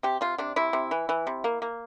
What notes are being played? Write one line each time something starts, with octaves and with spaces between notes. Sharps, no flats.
C3 G4
C3 F4
C3 D4
C3 E4
C3
E3
E3
C3
A#3
A#3